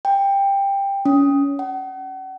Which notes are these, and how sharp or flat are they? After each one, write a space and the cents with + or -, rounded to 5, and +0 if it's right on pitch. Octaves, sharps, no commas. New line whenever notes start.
G5 +15
C#4 +20
F#5 +40